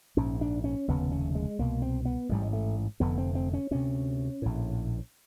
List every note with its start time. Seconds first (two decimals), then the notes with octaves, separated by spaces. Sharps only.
0.17 A#1 G#2 C#4
0.41 D4
0.64 C#4
0.88 F1 D#2 C#3 B3
1.12 C#4
1.35 G#3
1.59 C2 B2 A#3
1.82 C4
2.05 B3
2.29 A1 G#2 G3
2.42 G#3
2.53 A3
3.00 F1 F2 D3 B3
3.18 C4
3.35 C4
3.54 C#4
3.71 D2 C3 C#4
4.42 A#1 A2